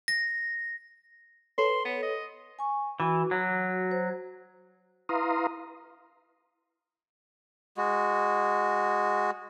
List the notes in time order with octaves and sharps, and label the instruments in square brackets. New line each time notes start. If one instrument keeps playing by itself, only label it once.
[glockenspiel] A#6
[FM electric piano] A4 B4 C#5 [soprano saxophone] C6
[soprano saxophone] B3
D#5
[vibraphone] G#5 C#6
[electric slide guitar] E3 [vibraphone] F#4
[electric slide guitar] F#3
[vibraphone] C5
[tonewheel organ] E4 B4 F5 A#5 C6 D#6
[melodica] G#3 F#4